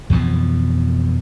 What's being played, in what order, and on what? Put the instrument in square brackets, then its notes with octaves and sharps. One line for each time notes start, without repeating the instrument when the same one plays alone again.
[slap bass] F2 B2 E3 F3